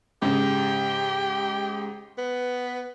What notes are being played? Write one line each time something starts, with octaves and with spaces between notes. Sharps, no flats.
G#2 C#3 G4
B3